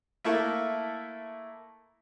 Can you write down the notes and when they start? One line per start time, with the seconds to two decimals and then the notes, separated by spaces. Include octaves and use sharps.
0.24 A3 A#3 E4 A4